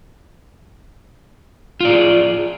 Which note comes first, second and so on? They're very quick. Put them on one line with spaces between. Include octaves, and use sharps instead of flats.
F4 D5 G#4